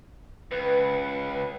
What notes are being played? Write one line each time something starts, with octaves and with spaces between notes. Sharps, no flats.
C#2 B4